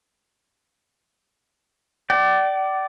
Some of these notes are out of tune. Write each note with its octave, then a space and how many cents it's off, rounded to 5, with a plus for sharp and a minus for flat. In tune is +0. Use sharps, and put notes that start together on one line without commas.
D5 +0 G5 -45